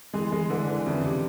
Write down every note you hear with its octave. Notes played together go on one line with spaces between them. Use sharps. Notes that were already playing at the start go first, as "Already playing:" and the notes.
E3 G#3
G#3
D3 E3
E3
F2 C#3
C3